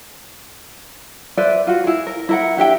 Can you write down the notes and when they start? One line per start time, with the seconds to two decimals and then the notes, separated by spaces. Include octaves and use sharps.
1.37 B4 C5 D5 E5
1.67 F4 F#4
1.84 E4 G#4
2.07 A#4
2.29 E4 A#4 F#5
2.57 D4 G4 E5 G5